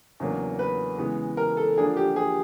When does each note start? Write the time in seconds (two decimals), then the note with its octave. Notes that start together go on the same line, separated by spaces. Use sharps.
0.20 E2 C#3 F#3 A#3 D4
0.59 B4
0.98 C#3 E3 G#3 B3
1.37 A#4
1.57 A4
1.78 D3 F3 A#3 D4 G#4
1.96 G4
2.16 G#4